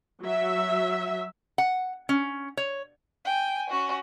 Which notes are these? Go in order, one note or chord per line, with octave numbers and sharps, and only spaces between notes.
F#3 E5
F#5
C#4
C#5
G5 G#5
C#4 F#4